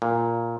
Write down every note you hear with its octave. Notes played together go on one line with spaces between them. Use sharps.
A#2